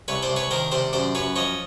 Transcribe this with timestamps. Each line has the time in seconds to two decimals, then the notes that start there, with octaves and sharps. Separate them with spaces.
0.08 C2 B4 C#5
0.23 C5 D5
0.30 C2
0.36 B4 C#5
0.51 D#3 A#4 C5
0.72 C3 C5 D5
0.93 F#2 C5 D5
1.15 F#2 B4 C#5
1.36 F3 C#5 D#5